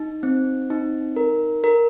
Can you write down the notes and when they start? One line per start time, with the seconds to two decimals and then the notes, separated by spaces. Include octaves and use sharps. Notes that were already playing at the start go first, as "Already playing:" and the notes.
Already playing: D#4
0.23 C4
0.70 D#4
1.16 A#4
1.64 A#4